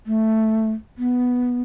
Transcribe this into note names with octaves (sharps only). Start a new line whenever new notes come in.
A3
B3